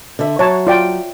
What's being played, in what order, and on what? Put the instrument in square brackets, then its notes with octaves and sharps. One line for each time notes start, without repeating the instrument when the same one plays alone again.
[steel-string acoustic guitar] D3 E5
[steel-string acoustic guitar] F#3 [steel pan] C#5 A5
[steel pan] F4 D5 G5